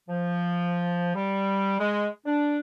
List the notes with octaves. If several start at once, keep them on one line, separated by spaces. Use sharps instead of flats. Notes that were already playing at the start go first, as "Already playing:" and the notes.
F3
G3
G#3
D4